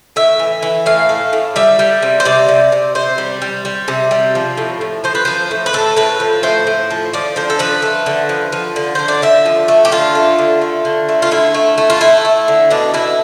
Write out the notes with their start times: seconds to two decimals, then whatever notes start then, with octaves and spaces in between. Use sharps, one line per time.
0.16 A2 E5
0.39 E3
0.63 E3
0.86 A2 F5
1.09 A3
1.33 A2
1.56 G3 E5
1.79 G3
2.02 C3
2.20 C5
2.25 C3 D5
2.48 C3
2.72 C3
2.95 C3 C5
3.18 G3
3.42 G3
3.65 G3
3.88 C3
4.11 G3
4.35 F3
4.57 A2
4.81 A2
5.04 F3 C5
5.15 B4
5.25 F3 C5
5.51 A2
5.66 B4
5.73 A2 A4
5.96 A2 B4
6.20 F3
6.43 A2 C5
6.67 A2
6.91 F3
7.13 F3 D5
7.36 D3 C5
7.50 A4
7.59 F3 B4
7.82 A3
8.06 D3
8.29 F3
8.52 F3
8.76 D3
8.95 D3 C5
9.08 D5
9.22 D3 E5
9.46 F3
9.68 A3
9.85 G4
9.92 D3 F4
10.15 A3
10.39 D3
10.61 A3
10.85 D3
11.09 A3
11.22 F4
11.31 D3 E4
11.54 A3
11.78 A3
11.90 F4
12.01 A3 E4
12.25 A3
12.48 D3
12.70 B2 D4
12.94 B2 E4